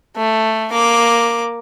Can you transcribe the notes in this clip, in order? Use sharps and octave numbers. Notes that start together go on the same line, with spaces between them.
A3
A#3 D6